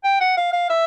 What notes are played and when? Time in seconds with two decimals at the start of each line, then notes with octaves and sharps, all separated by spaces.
0.04 G5
0.21 F#5
0.37 F5
0.53 F5
0.70 E5